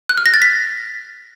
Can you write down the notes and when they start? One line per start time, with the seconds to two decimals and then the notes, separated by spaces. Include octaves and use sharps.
0.09 F#6
0.17 F6
0.26 A#6
0.34 A6
0.42 B6